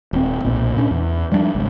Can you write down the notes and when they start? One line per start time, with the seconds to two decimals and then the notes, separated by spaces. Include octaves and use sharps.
0.13 D#1 C4
0.45 B1 A#2
0.77 A#2 C#4 D4
0.91 E2
1.32 F3 G3 B3 D4
1.55 G#1 C#2